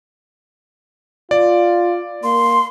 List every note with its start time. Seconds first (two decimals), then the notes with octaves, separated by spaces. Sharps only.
1.31 F4 D5
2.24 A#3 C6